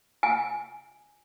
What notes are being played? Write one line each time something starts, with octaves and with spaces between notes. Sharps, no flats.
G#5